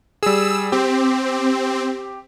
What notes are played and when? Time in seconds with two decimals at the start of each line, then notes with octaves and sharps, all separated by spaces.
0.23 G3 G#4 E6
0.72 C4 G4